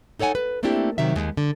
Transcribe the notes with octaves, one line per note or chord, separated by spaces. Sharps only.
D#4 A4 C#5 F#5 G#5
B4
A3 A#3 C4 D4 E4 G4
C3 D#3 F#3 E5
D#2 G#3
D3